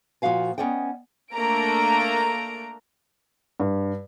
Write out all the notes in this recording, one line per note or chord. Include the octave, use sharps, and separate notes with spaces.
A#2 F3 D4 F#4 F5 G#5
B3 C#4 D5 D#5 G5
A3 A#3 D4 A#5 D7
G2